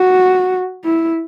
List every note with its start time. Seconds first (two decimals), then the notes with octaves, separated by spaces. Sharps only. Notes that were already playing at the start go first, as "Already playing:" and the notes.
Already playing: F#4
0.85 E4